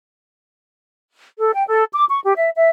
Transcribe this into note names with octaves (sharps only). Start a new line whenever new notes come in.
A4
G5
A4
D6
C#6
G4
E5
E5